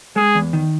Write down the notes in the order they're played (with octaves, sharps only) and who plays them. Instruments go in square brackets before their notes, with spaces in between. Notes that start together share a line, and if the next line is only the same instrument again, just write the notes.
[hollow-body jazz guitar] G#3 [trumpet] G#4
[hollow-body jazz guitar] E2
D#3